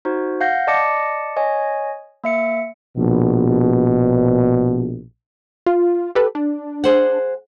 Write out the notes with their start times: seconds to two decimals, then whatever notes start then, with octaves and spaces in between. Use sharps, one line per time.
0.05 D#4 F#4 C5
0.41 F5 F#5 G6 A#6
0.67 D5 D#5 A5 D6 A#6 C#7
1.36 C#5 D#5 G#5
2.24 A#3 E5 C#7
2.98 A#1 B2
5.66 F4
6.15 G4 A4 B4
6.35 D4
6.84 G#4 C5 F#5